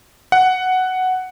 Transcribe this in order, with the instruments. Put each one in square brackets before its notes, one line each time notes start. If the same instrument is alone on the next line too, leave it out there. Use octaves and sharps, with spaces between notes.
[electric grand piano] F#5